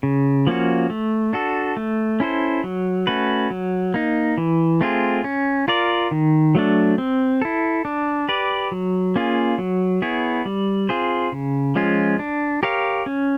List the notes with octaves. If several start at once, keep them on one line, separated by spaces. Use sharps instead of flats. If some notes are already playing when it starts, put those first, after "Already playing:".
C#3
F3 A#3 C#4 F#4
A3
D4 F#4 A4
A3
C#4 E4 A4 C5
F#3
A3 C#4 F#4 B4
F#3
A#3 D#4
E3
A3 C4 F4 G#4
C#4
F4 A#4 D5
D#3
F#3 A3 D4
C4
E4 A4
D4
G4 B4 D5
F#3
A#3 C#4 F4 G#4
F#3
B3 E4 G#4 C#5
G3
C4 F4 G#4 C5
C#3
F3 G#3 C#4 F4
D4
G4 A#4 C#5 F5
C#4